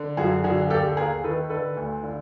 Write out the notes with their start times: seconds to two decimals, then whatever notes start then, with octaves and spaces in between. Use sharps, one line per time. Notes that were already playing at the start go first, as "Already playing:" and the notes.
Already playing: D3
0.17 F#2 F#4 G#4
0.44 D3 F#4 G#4
0.62 G#4
0.70 D#2 G4 A4
0.97 D#2 G#4 A#4
1.24 D#3 A4 B4
1.50 D3 A4 B4
1.77 D2
2.03 D3